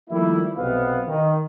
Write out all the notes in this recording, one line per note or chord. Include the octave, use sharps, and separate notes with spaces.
D#3 F3 G3 A3 A#3 E4
B1 C3 B3 F5
D#3